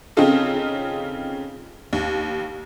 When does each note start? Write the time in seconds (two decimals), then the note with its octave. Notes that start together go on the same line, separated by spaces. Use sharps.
0.17 C#3 C4 C#4 D#4 F4 A4
1.93 D#2